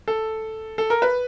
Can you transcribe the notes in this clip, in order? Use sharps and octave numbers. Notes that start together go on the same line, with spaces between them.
A4
A4
A#4
B4